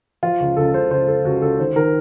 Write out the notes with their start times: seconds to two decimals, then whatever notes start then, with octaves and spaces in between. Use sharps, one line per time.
0.23 F3 F4
0.40 C#2
0.57 C#2 A4
0.74 C#2 C5
0.90 C#2 C5
1.08 C#2 A4
1.25 C#2 F#4
1.42 C#2 A4
1.59 D#3 C5
1.76 D#3 A#4